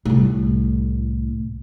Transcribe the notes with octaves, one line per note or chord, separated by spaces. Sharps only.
C2 A2